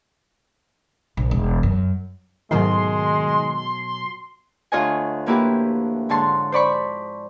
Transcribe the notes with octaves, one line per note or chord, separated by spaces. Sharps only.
A#1
E1
F#2
G#2 B2 D#3 F#3 G#3 A3 C6
D2 F4 C#5 D#5 G#5
F3 A#3 E4 F#4 G4 B4
G#2 D3 C#5 A5 C6
C5 D5 B5 C#6